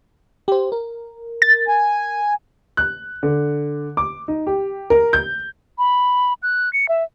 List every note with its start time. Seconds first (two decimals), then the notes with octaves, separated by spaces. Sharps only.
0.48 G4 C5
0.72 A#4
1.42 A6
1.68 G#5
2.77 F#6
3.23 D3
3.97 D6
4.28 D#4
4.47 G4
4.90 A#4
5.13 G6
5.78 B5
6.43 F#6
6.73 C#7
6.89 E5